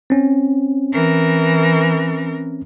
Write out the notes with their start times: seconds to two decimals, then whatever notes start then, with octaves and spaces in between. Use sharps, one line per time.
0.10 C4 C#4
0.93 E3 A#4